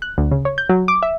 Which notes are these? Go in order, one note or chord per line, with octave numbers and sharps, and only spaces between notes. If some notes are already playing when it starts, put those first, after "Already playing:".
F#6
D2
C#3
C#5
G6
F#3
D6
E5